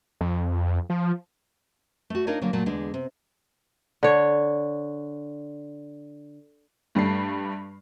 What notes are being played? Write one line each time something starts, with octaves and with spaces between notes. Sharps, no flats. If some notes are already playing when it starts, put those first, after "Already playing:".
F2
F3
A3 F#4
D4 D#4 F4 A#4 C#5 D#5
D3 F#3 A#3
A#2 F#3 A3
E2 D3 G#3 D4
C3
D3 C#5
G2 G3 A3 C7